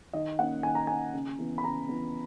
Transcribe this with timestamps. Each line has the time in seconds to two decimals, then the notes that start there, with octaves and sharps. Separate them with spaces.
0.13 D#3 D#5
0.39 A#3 C#4 F#5
0.63 D#3 G#5
0.75 A#5
0.87 A#3 C#4 G#5
1.13 C#3
1.39 E3 B3
1.58 B5
1.64 C#3 A#5
1.89 E3 B3